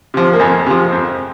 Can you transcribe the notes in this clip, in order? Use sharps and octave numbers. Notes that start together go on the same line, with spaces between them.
C3 F3
A#3
F2 G#3
C3 F3
F2